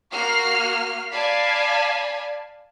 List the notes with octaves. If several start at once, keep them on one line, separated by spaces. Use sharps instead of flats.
A#3 F#4 F6 C7
D5 F5 G#5 A5 B5 G#6